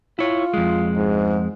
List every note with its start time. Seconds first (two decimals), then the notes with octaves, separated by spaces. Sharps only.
0.19 E4 F4 C#5
0.54 F2 G#3
0.96 G#2